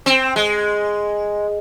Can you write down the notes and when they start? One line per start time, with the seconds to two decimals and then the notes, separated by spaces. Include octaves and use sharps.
0.06 C4
0.36 G#3